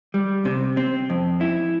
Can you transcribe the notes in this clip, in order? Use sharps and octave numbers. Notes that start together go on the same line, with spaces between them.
G3
C3
C4
F2
E4